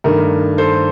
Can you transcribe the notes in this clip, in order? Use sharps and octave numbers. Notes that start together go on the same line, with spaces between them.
G2 D#3 A3 A#4
A4 C5